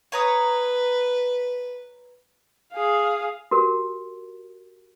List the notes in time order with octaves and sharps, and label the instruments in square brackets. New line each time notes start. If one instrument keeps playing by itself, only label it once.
[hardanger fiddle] B4 [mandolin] C#5 A#5 D#6
[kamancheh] G#4 F5
[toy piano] F#4 G4 A#4